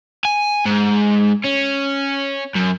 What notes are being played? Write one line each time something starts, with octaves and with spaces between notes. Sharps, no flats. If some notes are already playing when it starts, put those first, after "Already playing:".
G#5
G#2
C#4
F#2